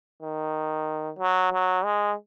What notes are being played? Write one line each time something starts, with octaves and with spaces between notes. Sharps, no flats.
D#3
F#3
F#3
G#3